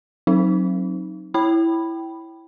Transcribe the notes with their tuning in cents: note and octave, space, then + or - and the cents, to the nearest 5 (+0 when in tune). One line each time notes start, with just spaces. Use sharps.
F#3 +0 C4 +30 D#4 +0
E4 +0 G5 -15 B5 +0